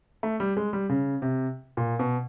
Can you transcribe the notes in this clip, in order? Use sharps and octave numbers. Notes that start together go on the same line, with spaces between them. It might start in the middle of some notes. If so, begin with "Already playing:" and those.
A3
G3
G#3
G3
C#3
C3
A#2
B2